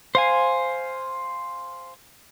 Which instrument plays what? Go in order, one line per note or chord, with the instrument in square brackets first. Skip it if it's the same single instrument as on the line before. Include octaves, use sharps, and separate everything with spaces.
[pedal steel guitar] C5 F5 G#5